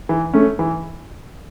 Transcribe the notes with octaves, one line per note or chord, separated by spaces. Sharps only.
E3
A3 C#4
E3